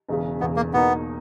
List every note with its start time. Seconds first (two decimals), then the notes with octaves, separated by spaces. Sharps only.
0.08 E1 E2 C#3
0.40 E1 E2 C#3 B3
0.56 A#3
0.73 E2 B2 A#3 B3 D#4